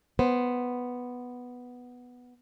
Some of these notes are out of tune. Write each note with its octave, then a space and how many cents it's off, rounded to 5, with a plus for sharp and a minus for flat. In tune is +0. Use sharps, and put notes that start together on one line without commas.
B3 +0 C5 +0